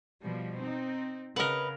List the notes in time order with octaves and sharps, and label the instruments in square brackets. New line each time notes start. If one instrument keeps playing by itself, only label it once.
[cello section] B2 F3 G3
C4 D#4
[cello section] C#3 [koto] A#4 F#5 [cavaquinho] B4 D#5